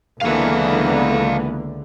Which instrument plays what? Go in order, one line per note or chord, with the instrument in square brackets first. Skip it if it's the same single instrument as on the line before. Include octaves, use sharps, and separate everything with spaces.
[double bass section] C#2 D3 [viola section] E3 A#3 B3 [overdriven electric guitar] A4 F5